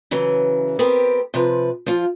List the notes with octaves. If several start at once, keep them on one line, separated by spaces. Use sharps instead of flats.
C#3 E3 F#3
B3 C4 G4 A#4
C3 F3 B4
F3 F4